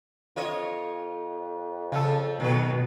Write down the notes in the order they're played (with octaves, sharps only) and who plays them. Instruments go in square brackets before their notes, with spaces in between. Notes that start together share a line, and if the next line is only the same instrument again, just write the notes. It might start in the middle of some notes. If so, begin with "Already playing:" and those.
[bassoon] F2 [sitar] F4 C#5 D#5
[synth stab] C#3 A4 [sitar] F3 F4
[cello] B2 [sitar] D#3 F#3 B4